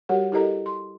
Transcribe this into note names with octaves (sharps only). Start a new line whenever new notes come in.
G3 F#4 G4 A#4 C#5 F#5
E4 G4 A4 A#4 D#5 A#5
C6